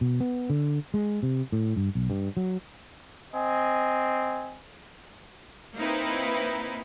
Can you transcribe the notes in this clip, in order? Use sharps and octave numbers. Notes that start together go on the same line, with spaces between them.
B2
B3
D3
G#3
C3
A2
G2
B1
G2
F#3
C4 D#5 G#5
A#3 C4 D#4 E4 B4